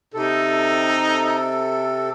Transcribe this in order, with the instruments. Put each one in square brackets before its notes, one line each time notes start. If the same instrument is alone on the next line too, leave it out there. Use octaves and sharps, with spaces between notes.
[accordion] C3 A4 [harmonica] D#4